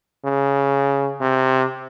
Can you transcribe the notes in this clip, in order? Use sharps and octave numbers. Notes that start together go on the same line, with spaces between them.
C#3
C3